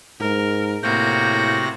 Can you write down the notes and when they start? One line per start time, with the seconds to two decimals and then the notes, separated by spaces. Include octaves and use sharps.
0.20 G#2 A#4
0.83 A2 C3 A#3 F#4 G6 A#6